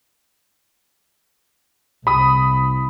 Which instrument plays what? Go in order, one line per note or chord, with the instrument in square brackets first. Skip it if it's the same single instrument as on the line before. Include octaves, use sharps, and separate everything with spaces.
[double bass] C2 [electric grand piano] B5 D#6